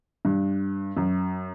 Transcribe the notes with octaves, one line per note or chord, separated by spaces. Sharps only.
G2
F#2